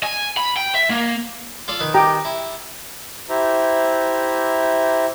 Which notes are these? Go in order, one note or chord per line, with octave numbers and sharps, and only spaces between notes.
G#5
B5
G5
E5
A#3
F4 A4 D5
D#3 B4
G4 G5 A#5
E4
E4 G4 C5 E5 A#5